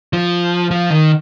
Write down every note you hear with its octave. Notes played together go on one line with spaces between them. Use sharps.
F3
F3
D#3